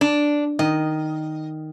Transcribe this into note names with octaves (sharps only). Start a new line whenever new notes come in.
D4
D#3 D#5